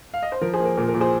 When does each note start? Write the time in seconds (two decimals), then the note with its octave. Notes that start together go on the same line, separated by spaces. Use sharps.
0.14 F5
0.23 D#5
0.32 C5
0.41 F3 A#4
0.54 G#4 C5
0.60 A#3
0.65 A#4
0.77 A#2 A#4
0.89 A#4
0.94 A#2
1.00 G#4 C5